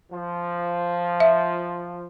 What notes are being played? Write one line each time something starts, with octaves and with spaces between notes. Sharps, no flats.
F3
E5